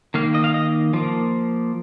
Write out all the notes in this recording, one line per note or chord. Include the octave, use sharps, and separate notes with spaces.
D#3 A#3 F5
D#5
F5
D#5
F3 A#3